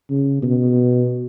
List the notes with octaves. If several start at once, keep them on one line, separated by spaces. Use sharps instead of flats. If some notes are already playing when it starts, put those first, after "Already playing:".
C#3
B2